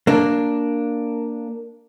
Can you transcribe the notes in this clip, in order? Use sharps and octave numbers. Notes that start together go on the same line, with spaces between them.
A#3 D4